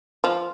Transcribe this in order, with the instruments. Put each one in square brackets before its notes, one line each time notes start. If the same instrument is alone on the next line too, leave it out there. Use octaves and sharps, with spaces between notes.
[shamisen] F3